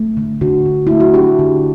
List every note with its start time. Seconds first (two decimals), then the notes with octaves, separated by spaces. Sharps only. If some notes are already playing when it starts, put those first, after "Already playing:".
Already playing: A3
0.17 D3
0.41 D3 F#4
0.66 D3
0.87 A3 E4
1.00 F#4
1.14 D4 G4
1.39 D3